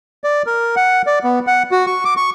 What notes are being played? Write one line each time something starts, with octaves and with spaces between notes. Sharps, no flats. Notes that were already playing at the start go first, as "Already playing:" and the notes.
D5
A#4
F#5
D5
B3
F#5
F#4
C#6
D6
C#6